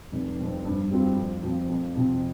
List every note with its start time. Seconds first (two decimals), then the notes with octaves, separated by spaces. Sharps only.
0.12 F1
0.39 F2 F3 C4
0.65 G2
0.91 G3 C4 F4
1.17 F2
1.43 F3 C4 F4
1.69 F2
1.96 C3 F3 C4